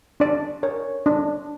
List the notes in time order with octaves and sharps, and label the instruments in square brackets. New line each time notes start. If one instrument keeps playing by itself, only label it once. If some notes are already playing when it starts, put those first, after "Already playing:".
[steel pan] D4 D5
A#4 C#5
D4